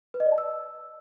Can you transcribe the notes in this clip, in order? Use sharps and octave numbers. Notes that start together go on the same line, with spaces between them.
B4
D#5
D5
A5
E6